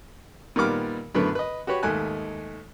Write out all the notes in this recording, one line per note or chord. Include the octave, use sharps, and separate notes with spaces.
A#2 D#3 G3 B3 D6 F6
F#2 A2 D3 B3 B4
B4 D#5
F#4 G4 B4 C#5
D#2 G#2 A3 G#5 F#6